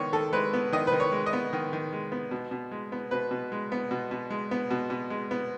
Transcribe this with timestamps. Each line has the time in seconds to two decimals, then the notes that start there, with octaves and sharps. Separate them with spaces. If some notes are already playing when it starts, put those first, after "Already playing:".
Already playing: D#3 G#3 B3 C#5
0.12 D#3 A4
0.33 G#3 B4
0.53 B3
0.72 D#3 D#5
0.87 B4
0.92 D#3
1.00 C#5
1.12 G#3
1.26 D#5
1.33 B3
1.53 D#3
1.73 D#3
1.93 G#3
2.12 B3
2.31 B2
2.51 B2
2.71 G#3
2.92 B3
3.11 B2 B4
3.31 B2
3.52 G#3
3.72 B3
3.91 B2
4.11 B2
4.30 G#3
4.51 B3
4.71 B2
4.90 B2
5.10 G#3
5.31 B3